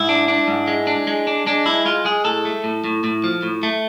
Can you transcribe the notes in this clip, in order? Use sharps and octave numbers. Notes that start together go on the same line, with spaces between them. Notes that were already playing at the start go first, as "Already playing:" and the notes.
Already playing: G#2 E4
D4
D4
G#2
G#3
D4
G#3
D4
G#3 D4
G#3 E4
G#3 F4
G#3 G#4
A2 A4
A3
A2
A2
A2
F3
A2
A3